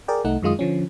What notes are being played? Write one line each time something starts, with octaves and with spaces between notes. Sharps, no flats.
G#4 A#4 D5 G5
C2 A3 D#4 F#5
F#2 D#3 G#3 F4 D#6
D3 F3 C#4